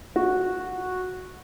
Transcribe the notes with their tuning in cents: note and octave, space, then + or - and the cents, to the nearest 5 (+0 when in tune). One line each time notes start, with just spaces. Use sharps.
F#4 -10